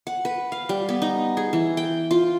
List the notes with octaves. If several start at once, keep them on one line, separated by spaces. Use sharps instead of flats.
F#5
B4
F5
G3
B3
D#4
G#4
E3
G5
F4